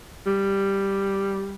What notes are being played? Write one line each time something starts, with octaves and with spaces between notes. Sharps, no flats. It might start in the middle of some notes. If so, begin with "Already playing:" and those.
G3